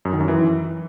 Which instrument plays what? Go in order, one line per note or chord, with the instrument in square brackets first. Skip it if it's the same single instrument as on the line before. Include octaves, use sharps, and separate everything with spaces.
[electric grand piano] F#2
D#3
F#2
E3